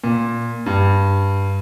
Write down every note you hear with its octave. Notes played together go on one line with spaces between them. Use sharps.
A#2
G2